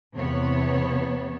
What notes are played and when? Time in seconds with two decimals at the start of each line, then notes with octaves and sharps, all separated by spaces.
0.13 E2 C3 B3 C#5